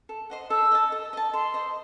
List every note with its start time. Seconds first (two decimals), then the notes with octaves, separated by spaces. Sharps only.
0.09 A4
0.30 C5 D#5 F#5
0.50 A4 E6
0.72 D#5 A5
0.92 A4
1.13 D#5 A5
1.33 A4 C6
1.54 C5 D#5